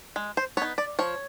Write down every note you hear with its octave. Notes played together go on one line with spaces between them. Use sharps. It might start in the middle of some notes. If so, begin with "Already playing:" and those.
G#3
C5
B3 D#4 C#5
D5
F3 C#5